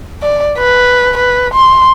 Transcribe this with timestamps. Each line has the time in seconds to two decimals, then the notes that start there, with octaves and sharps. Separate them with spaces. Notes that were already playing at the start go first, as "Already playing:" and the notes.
0.22 D5
0.58 B4
1.17 B4
1.54 C6